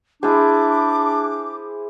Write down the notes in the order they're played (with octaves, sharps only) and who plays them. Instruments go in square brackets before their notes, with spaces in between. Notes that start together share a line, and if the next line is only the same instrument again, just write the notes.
[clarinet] D4 [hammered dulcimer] E4 C5 [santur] G#4 [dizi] D6